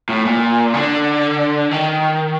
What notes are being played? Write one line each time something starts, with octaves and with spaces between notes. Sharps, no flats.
A2
A#2
D3
D#3